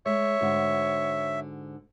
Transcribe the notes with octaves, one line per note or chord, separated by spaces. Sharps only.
G#3 C#5 E5
G#2 D3 F#4